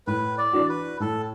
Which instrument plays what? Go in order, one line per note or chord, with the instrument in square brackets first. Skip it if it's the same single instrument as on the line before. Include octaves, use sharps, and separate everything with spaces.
[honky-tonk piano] A2 [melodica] B4
[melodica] D5
[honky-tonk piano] E3 D4 F#4
[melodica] B4
[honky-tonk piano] A2 [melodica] A4